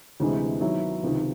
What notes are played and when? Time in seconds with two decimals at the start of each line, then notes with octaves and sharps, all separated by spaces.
0.20 D2 C3 E3 G#3
0.61 D#3 F#3 B3 E4
1.03 C#2 C3 D#3